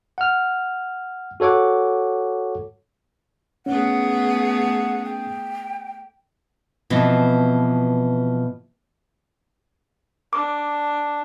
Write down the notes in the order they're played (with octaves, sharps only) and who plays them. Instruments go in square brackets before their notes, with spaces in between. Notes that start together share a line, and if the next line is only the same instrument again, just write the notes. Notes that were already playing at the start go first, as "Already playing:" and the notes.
[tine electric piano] F#5 F6
F#4 A4 C#5 F#5 D6
[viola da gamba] A3 B3 G#4 [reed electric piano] C#4 [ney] F#5
[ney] G5
[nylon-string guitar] B2 E3 F3 C4
[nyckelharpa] D4 [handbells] D6